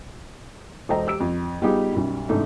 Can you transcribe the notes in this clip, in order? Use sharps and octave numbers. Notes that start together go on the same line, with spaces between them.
E1 A4 C5 D#5 G5 A#5
G4 E6 D7
F2
G3 B3 D#4 F4 G4 G#4
B1 F#2 G3
G#2 C3 E3 A3 D4 D#4